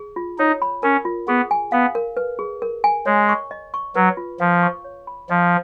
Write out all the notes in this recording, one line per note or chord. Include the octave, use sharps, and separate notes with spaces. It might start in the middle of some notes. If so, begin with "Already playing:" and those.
Already playing: G#4
F4
D#4 C#5
B5
C#4 A#4
F4
B3 G#4
G#5
B3 F5
A#4
B4
G#4
A#4
G#5
G#3 C#5
C#6
D#5
C#6
F#3 B4
F4
F3 F5
C#6
C#5
B5
F3 D#5